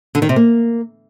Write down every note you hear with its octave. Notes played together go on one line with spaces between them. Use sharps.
D3
D#3
C3
A#3